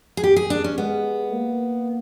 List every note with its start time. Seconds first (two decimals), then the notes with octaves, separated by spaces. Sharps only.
0.17 G#4
0.24 G4
0.36 G#4
0.50 D4
0.64 C#4
0.78 G#3 B3
1.32 A#3